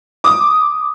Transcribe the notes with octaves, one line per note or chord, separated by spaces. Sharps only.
D6 D#6